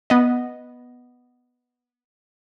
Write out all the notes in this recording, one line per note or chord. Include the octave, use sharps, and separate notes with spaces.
B3 D#5